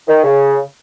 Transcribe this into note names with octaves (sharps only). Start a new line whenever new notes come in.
D#3
C#3